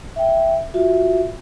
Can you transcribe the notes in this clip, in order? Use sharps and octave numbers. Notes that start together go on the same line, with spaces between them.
E5 G5
F4 F#4 E5